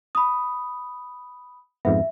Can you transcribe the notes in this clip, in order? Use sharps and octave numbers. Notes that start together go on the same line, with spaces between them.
B5 D#6
F2 G#2 B3 E5